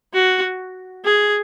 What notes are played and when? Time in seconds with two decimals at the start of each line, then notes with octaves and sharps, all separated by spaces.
0.13 F#4
1.04 G#4